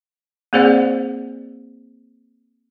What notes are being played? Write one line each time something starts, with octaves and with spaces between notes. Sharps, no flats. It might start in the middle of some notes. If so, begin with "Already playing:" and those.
A#3 C4 G#4 C5 D5 F#5